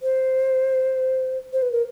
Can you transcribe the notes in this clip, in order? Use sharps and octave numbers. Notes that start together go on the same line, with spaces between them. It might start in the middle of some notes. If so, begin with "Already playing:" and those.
C5
C5
B4
A#4